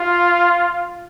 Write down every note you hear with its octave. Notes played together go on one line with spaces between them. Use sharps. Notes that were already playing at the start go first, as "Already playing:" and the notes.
Already playing: F4